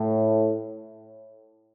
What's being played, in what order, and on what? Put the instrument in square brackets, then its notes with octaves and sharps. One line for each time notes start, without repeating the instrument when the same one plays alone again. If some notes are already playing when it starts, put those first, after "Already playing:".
Already playing: [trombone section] A2